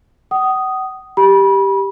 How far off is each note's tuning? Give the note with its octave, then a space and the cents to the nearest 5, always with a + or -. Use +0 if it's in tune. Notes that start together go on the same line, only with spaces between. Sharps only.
F#5 +40 D#6 +0
G4 +0 B5 -30